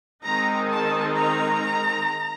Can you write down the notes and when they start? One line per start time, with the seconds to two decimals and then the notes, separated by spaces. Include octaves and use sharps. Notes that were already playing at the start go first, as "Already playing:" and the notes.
0.23 D#3 G#3 C4 D#4 A#5
0.70 A5
1.16 A#5